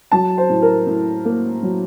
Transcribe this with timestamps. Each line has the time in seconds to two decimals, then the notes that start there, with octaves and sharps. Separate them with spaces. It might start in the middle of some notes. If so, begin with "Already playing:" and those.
0.12 F#3 A5
0.38 C5
0.50 A2
0.62 A#4
0.87 A2
1.25 A#3
1.63 F#3